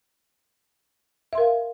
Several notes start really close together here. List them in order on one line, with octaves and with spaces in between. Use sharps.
E5 C6 A#4 F5